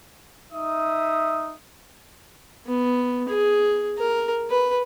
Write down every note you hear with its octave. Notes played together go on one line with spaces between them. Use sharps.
D#4 E5 D#6
B3
G#4
A#4
B4